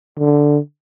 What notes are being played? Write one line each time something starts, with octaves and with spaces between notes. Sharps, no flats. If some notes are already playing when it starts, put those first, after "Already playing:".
D3